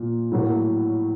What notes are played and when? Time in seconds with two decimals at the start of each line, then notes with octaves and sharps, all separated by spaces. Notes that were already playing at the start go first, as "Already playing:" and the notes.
Already playing: A#2 F3
0.32 A2 F#3 A#3